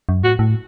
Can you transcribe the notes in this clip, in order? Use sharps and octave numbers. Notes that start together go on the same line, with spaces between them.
F#2
A2 F#4
A2